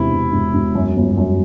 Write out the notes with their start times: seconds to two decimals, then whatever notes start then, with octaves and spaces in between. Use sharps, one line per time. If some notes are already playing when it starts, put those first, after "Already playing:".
Already playing: E1 E2 C3 E4
0.12 E1
0.33 E1
0.54 E1
0.75 F#2
0.96 G1
1.18 F#2